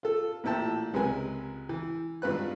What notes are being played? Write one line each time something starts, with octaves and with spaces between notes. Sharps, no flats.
F4 A4
A1 A#2 E4 G5 A5
C#2 C3 G#3 A#4 B4 G#5
E3
G#1 G2 F4 B4 F#6